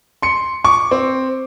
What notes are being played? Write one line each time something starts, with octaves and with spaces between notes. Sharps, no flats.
C6 C#7
C#6 D6
C4